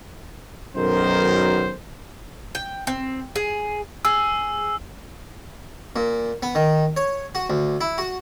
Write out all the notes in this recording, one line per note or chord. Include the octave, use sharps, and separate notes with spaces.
B1 F#2 D#3 F#3 A#4 C5
G5
C4
G#4
G#4 E6
A#2
B3
D#3
C#5
F#4
D2
E4
F#4